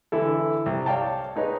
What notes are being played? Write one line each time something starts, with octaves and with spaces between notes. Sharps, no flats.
D3 E3 E4 A4
C2
C#5 D5 F5 G5 A5
G#3 D#4 B4 C#5 D#5